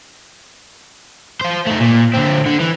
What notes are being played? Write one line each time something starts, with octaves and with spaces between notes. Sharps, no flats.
F4 C5
A3 D#4
A#2
D3 C4
D3
E3